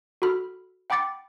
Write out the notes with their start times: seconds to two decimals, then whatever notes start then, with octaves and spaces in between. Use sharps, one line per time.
0.22 F#4 A4 B5 F6
0.90 F#5 G5 B5 D6 A6 C#7